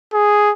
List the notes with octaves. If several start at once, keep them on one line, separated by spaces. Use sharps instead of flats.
G#4